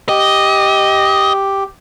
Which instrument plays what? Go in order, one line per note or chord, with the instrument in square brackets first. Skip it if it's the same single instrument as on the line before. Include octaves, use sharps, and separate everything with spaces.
[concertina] G4 [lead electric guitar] D#5